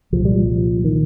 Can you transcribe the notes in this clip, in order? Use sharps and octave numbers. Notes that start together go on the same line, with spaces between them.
C2 A#2 F3
G3
F3
D#3